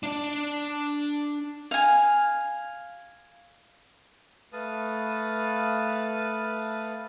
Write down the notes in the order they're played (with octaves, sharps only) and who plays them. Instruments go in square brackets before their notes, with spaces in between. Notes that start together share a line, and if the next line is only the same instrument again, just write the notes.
[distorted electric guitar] D4 D5
[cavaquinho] F5 G#5
[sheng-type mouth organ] A3 B4 F5 A5 D#6